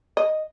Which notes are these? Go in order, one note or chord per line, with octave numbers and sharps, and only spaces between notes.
D#5